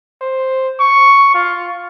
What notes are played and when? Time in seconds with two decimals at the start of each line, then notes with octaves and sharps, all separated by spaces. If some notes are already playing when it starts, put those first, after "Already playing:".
0.21 C5
0.80 C#6
1.34 F4